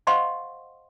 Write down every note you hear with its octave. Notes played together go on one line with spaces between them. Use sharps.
C5 D#5 F5 F#5 C6 C#6